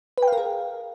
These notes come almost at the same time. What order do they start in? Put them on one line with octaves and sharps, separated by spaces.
B4 G5 F5 A#4 G#4